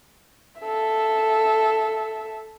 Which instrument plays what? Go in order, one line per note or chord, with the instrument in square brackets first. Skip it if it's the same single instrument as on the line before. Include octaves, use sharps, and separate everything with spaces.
[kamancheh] A4 E5